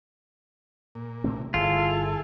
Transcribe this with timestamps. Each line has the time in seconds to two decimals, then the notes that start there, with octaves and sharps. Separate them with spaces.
0.95 A#2
1.24 C3 A3 C4
1.54 G1 E4 F4 G#4 A4